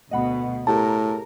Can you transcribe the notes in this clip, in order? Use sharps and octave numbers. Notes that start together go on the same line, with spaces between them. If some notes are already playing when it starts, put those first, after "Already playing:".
D2 B2 D#5 F#5 B5
A2 G4 G#4 A#4 A5